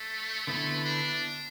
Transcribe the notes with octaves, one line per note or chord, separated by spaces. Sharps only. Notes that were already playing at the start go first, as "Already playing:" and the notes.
Already playing: A3
D3 A3 B3 E4 B4
D4